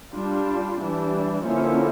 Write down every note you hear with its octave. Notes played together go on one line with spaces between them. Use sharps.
G3 D4 F4
E3 G3 D4
D3 F3 A#3 C#4 E4